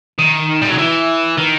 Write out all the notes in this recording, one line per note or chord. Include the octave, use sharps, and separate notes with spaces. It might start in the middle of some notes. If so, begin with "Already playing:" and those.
D#3
G3
F#3
E3
D#3